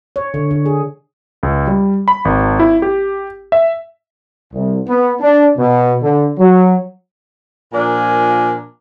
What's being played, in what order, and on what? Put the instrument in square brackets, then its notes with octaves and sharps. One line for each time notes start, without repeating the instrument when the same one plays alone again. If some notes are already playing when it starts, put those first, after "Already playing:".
[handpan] C#5
D3
D3
G#4
[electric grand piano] C#2
G3
B5
G#1
E4
G4
E5
[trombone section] C2
B3
D4
B2
D3
F#3
[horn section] A#2 F3 D4 A#4 G#5